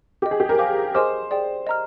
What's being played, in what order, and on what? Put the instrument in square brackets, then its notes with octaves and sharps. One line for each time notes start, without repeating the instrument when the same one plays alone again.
[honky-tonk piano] G4 [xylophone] D#5 G5 D6
[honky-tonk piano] G#4
G4
A#4
[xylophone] C5 F5 G#5 D6
[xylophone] G#4 D#5 G#5 D6 F6 [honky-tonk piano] C5
[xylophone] G#4 D5 G5
D#5 A#5 F6